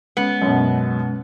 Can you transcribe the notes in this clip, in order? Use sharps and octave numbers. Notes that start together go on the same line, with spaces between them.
G#3 B3 C#4
F#2 B2